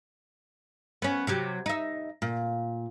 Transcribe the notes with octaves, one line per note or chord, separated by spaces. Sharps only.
B3 C#4
C3 F#3 G4
D#4 E5
A#2